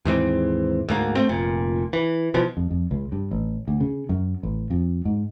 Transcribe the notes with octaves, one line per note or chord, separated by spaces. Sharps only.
D#2 G#2 E3 C4
D2 G#2 A#3
A3 C4
F1 A#2
E3
B2 E3 F3
F2
F2
C#2
G2
A1
D2
C#3
F#2
A1
F2
G#2